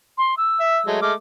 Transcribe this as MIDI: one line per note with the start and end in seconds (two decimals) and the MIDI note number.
0.18 0.35 84
0.37 0.86 88
0.60 0.78 76
0.87 0.98 54
0.87 0.98 56
0.87 0.98 57
1.02 1.13 56
1.02 1.13 57
1.02 1.13 86
1.02 1.12 89